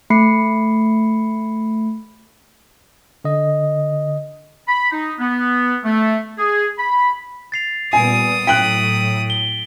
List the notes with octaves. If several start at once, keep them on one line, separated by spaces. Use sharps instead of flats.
A3 B5 C7 C#7
D3 D#5
B5
D#4
B3
A3
G#4
B5
A6 C7 F7
A#2 G3 B3 G#5 D#6 C7 D7
A2 F#3 G5 F#6 B6 D7 F#7
G7